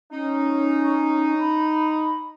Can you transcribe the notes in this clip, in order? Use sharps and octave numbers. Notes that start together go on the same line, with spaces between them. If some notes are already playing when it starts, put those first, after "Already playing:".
C#4 D#4
B5